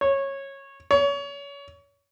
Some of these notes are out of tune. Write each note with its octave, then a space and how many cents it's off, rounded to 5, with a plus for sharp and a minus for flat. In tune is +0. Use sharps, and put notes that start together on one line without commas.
C#5 -15
C#5 +30